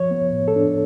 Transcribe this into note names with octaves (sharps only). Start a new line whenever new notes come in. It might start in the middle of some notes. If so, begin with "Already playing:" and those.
Already playing: F3 C#5
B3
A2
A4
D4